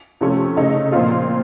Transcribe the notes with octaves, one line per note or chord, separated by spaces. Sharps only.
C3 F3 A3 C#4
C#3 A3 D#4
A#2 F3 C4 F4